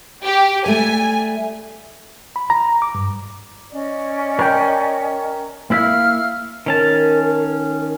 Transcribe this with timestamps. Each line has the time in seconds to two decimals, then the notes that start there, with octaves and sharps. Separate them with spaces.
0.24 G4
0.66 G3 A3 G#5
2.36 B5
2.50 A#5
2.82 D6
2.95 G2
3.71 C#4 D5 D#5
4.39 A#4 G5
5.70 A#3 E4 E5 F5 F6
6.66 D#3 C#4 A#4 A5